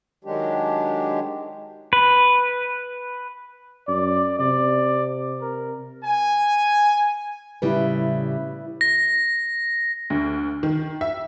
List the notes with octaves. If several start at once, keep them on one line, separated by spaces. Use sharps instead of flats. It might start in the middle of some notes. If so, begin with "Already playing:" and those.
D#3 F#3 G#3 D4 G4
B4
F#2 D5
C3 D5
A#4
G#5
A2 C#3 G3 E4 B4
A#6
D2
D#3
E5